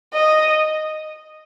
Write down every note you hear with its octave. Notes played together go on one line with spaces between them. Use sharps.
D#5